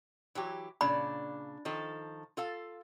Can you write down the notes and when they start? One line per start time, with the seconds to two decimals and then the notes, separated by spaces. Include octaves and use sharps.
0.35 E3 F#3 G4
0.81 A#2 C#3 D4 B5
1.65 D#3 F3 A4
2.37 F4 A4 F5